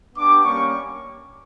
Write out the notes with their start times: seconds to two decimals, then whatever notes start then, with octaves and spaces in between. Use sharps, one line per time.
0.15 B3 D4 G4 D6
0.44 G3 A#3 C#4 C#6